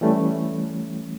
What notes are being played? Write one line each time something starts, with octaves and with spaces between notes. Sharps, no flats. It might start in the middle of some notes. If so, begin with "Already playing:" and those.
E3 G3 A3 C#4